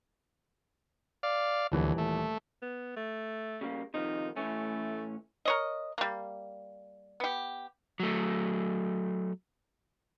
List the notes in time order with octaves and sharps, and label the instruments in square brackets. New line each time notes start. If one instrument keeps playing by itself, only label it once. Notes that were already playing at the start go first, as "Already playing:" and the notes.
[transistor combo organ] D5 F5
[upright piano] D#1 E3 [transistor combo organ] D2
[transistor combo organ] A3
[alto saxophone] B3
A3
[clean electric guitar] C#3 G3 A#3
[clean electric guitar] C3 D#3 F3 [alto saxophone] D#4
[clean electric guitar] A2 E3 C#4 [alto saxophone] A3
[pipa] A#4 C#5 D#5
G3 A#3
B3 G4
[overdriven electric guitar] F#3 A3